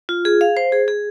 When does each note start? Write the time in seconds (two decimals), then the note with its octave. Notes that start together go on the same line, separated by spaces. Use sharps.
0.09 F4
0.25 G#4
0.41 F5
0.57 C5
0.72 G#4
0.88 G#4